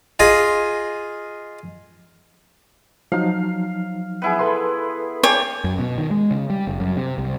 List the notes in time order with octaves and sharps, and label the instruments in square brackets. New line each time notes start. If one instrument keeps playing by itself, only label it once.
[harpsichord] F4 G#4 D#5
[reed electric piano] F3 F#3 D#4 [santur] F5
[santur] B3 E4 G#4
[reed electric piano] A4 B4 C6
[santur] G#4 D5 G5 [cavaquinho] C#5
[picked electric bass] F#2
B2
D#3
G#3
C#3
G3
F#1
F#2
C3
C2